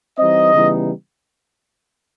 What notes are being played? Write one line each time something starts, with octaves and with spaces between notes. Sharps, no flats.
E3 G3 C4 D#4 D#5
C#3 E3 G3 B3 D#4